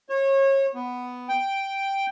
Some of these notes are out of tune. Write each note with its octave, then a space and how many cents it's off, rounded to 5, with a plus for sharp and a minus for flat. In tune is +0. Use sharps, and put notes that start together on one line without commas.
C#5 -30
B3 +5
G5 +0